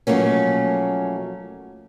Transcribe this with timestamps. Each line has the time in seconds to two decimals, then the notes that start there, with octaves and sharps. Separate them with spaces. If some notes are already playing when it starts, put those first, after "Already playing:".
0.07 B2 F3 F#3 A3 A#3 C#4